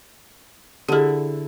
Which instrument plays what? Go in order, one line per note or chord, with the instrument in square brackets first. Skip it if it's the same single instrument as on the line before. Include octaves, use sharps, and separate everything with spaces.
[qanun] D3 E4 [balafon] G4 G#4